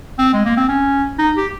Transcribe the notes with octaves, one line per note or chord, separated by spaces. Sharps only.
C4
G#3
A#3
C4
C#4
D#4
G4